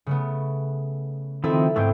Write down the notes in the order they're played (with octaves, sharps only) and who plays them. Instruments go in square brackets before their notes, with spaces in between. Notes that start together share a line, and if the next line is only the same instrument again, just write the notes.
[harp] C#3 A3 B3
[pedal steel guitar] D#3 F3 C4 [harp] E4 A4 E5
[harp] G#2 G#3 B3 [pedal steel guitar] A3 C4 G5